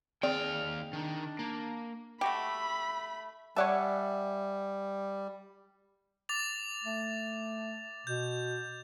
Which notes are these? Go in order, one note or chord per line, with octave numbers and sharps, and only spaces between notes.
D#2 C4 G#4 D5 G5 F6
D#3 D4
A#3
A3 F#4 G4 B5
G3 C#5 D5 E5 F#5 G#5 A5
D6 A6 F7
A3
B2 G6